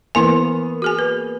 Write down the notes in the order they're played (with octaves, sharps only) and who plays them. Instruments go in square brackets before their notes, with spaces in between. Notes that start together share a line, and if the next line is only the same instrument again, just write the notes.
[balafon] E3 E4 G#5 [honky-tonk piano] A#3 B3
[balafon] F#4 G#4 G#5
B4